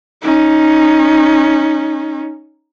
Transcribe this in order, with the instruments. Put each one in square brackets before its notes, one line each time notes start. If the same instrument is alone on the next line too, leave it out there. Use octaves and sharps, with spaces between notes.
[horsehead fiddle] C#4 D#4